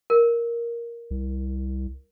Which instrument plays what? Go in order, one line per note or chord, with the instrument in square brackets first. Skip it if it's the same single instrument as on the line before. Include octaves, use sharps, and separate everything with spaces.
[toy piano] A#4
[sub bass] C2